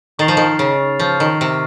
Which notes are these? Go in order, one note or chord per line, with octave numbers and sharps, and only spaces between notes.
D#3 C#6 F6 A6 C7 F7
F3
D#3
C#3
F3 C#6 F6 C7
D#3
C3